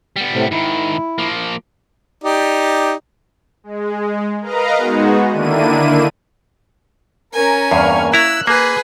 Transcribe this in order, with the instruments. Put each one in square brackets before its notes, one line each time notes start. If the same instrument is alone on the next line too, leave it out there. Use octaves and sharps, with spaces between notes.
[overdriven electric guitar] G3 B3
[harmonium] A2 C3
[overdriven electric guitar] G#2 D#3 [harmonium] E4
[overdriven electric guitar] F3 A#3
[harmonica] D#4 G4 D5
[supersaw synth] G#3
A#4 B4 D#5 F5 A#5
G#3 B3 D#4 F#4
D3 D#3 A#3 D4 E4 D#7
[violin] C#4 G#5 [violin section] A#4 A#5
[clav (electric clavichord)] E2 G2 [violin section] A#3 C#6 F6
[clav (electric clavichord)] E4 A#5 [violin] E6 [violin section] F#6
[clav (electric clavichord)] A#3 [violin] G#4 B4